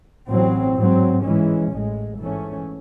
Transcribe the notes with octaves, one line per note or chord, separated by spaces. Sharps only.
A1 A2 F#3 C4
G#2 F#3 C4
G#2 E3 G#3 C#4
A1 A2 G#3
G#2 E3 A3 C#4